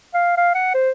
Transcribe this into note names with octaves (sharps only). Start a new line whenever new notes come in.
F5
F5
F#5
C5